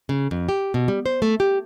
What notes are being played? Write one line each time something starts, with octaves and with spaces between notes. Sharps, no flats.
C#3
F2
G4
B2
G3
C5
A3
G4